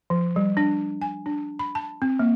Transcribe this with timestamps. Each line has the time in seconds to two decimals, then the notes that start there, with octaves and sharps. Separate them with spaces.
0.10 F3
0.36 G3
0.57 D4
1.02 G#5
1.26 D4
1.59 B5
1.75 A5
2.02 C4
2.19 A#3